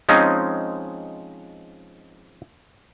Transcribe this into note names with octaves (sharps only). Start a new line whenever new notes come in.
F3 G#3 C4 C#4 D#4